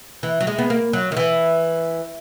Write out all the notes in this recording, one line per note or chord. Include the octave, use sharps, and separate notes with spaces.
E3
F#3
G#3
B3
A#3
F#3
D#3
E3